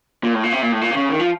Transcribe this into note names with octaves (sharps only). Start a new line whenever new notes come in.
A#2
A2
A#2
C3
A#2
A2
A#2
C3
C#3
D#3
F3